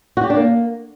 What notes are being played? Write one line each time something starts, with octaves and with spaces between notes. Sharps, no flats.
F#4
G4
D4
A#3